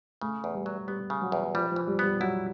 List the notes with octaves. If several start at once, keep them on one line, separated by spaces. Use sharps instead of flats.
C#3 A3
E2
G3
F#3
G3 B3
C#3
F#3
E2
F3 G3
E3 F3
G3
G3 B3
F#3 E4